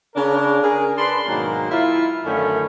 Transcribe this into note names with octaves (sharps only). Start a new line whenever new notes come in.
C#3 D4 A#4
G#4 A#4
D4 B4 B5 C6
G#2 B2 D#3 F#3 A#3
E4 F4
F#2 D3 D#3 A3 C#4 B5